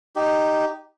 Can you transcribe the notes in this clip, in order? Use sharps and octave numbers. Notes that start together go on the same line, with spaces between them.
D#4 G4